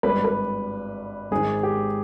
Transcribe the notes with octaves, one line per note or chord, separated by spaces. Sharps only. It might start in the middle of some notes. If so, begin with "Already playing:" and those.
G#1 G2 G3 B4
B4
G#1 G#2 D#3 G#3 G#4
G4